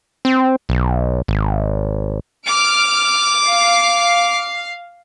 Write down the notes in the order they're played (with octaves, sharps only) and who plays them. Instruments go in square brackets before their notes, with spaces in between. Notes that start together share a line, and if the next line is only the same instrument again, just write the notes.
[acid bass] C4
B1
G#1
[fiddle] D6 [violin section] F6 D7
[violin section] F5